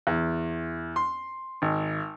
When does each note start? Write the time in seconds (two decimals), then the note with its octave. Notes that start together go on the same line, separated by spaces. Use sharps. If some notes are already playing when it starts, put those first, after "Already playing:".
0.07 E2
0.96 C6
1.62 G#1